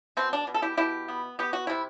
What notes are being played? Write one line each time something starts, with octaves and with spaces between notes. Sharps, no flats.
B2 C4
D4
B2
A4
E4 G4
B2 E4 G4
B3
B3 G4
F#4
C3 E4